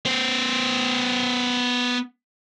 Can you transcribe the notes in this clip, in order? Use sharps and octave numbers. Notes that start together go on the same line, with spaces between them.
B3 C5